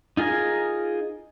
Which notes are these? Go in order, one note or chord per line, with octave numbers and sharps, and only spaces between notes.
D#4 F4 G#4 A#4 G#5